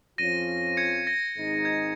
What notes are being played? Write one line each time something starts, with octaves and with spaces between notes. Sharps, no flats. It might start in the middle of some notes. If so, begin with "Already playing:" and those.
F2 F3 C#4 F4 A#6 D#7
G#6 C#7
A#6
G#1 G#2 G#3 D#4
G#6